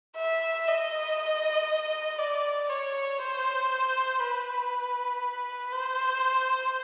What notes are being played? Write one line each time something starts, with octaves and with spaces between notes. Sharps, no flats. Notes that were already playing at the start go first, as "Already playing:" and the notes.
E5
D#5
D5
C#5
C5
B4
C5